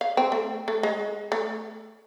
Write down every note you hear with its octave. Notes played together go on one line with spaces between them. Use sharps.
F5
C4
A3
A3
G#3
A3